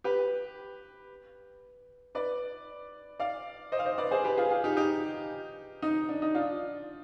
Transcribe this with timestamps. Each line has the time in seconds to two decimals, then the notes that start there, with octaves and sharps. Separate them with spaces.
0.04 G4 B4
2.15 B4 D5
3.20 D5 F5
3.72 C5 D#5
3.79 F5
3.85 C5 D#5
3.98 B4 D5
4.11 G#4 C5
4.24 G4 B4
4.38 F4 G#4
4.51 F4 G#4
4.64 D#4 G4
4.77 D#4 G4
5.82 D#4
6.09 D4
6.22 D#4
6.35 D4 F4